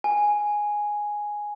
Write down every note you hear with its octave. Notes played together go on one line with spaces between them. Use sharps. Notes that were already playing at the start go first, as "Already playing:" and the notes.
G#5